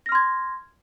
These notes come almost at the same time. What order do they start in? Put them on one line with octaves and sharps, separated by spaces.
A#6 F6 C6 G#6